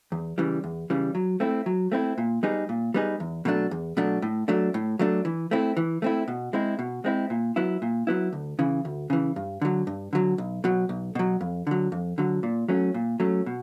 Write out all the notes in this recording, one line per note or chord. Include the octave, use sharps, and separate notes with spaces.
E2
C#3 E3 G3
E2
C#3 E3 G3
F#3
A3 C4 E4
F#3
A3 C4 E4
A#2
G3 B3 D#4 G#4
A#2
G3 B3 D#4 G#4
E2
B2 F#3 A3 D4
E2
B2 F#3 A3 D4
A2
F#3 A3 D4
A2
F#3 A3 D4
E3
A3 C4 E4
E3
A3 C4 E4
B2
G#3 C4 E4
B2
G#3 C4 E4
A#2
F#3 B3 E4
A#2
F#3 B3 E4
D2
C#3 E3
D2
C#3 E3
G2
D3 F#3
G2
D3 F#3
B1
B2 F#3
B1
B2 F#3
F2
D3 F#3
F2
D3 F#3
A#2
F#3 A3 C#4
A#2
F#3 A3 C#4
B2